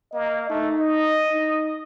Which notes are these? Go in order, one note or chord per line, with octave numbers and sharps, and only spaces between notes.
A#3 D#5
A3 D#4
D#5
D#4